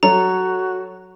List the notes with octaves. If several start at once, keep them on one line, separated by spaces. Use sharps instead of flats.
F#3 F#4 A4 C#5 A#5